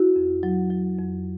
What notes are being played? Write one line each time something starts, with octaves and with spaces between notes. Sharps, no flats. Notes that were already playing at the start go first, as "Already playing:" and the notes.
Already playing: E4 F#4
F2
F#3
F#3
F2